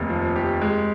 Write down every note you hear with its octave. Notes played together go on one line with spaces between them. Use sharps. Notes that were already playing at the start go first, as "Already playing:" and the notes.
Already playing: F1 D#2
F3
G4
G#3